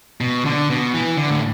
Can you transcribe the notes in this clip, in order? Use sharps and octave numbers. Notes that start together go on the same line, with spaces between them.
B2
D3
B2
E3
D3
A2